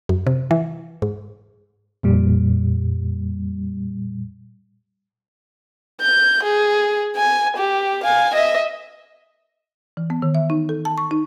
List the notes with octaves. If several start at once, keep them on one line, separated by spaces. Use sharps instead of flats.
F#2
C3
E3
G#2
F2 A#2 G3
G6
G#4
G#5
G4
F5 G#5
D#5 E5
E3
B3
D#3
E5
D#4
A4
A5
C#6
D#4